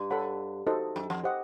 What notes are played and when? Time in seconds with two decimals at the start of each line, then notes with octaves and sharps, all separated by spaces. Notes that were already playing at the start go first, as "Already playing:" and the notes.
Already playing: G2
0.11 A4 C#5 F#5 B5
0.67 D#4 F#4 A4 C5 D#5
0.96 F#2
1.10 F2
1.23 G4 C5 D#5 F#5